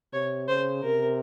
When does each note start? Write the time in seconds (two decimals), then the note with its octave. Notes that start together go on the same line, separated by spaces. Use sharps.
0.13 C3 C#5
0.48 C#3 C5
0.83 C3 A#4